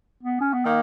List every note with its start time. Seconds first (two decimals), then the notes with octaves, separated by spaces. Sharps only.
0.23 B3
0.40 C#4
0.54 B3
0.65 D#3 A#3